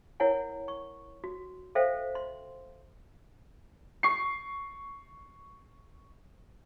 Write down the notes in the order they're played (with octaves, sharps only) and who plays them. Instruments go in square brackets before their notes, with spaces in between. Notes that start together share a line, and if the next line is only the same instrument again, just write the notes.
[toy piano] E4 A#4 C#5 F#5 G#5
C#6
F#4
A4 C5 E5 F5 G5
C6
[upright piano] C#6 C7